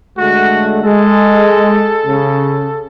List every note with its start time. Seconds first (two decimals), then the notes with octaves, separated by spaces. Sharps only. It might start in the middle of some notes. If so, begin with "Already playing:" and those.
0.18 D3 G#3 A3 F#4
0.83 G#3 A4
2.06 C#3